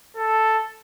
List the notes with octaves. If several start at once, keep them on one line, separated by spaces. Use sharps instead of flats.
A4